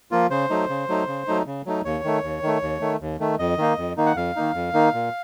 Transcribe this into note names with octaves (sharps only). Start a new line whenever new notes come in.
F3 A#3 F4
C#3 C5
F#3 A3 D#4
C#3
F#3 A3 D#4
C#3
F#3 A3 D#4
C#3
F#3 A3 D#4
D#2 C#5
D#3 A3
D#2
D#3 A3
D#2
D#3 A3
D#2
D#3 A3
F2 D#5
D#3 A#3 D#4
F2
D#3 A#3 D#4
F#5
F2 F5
D#3 A#3 D#4
F2
D#3 A#3 D#4
A#2